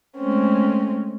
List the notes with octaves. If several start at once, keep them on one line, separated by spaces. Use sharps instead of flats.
G#3 A3 C4 C#4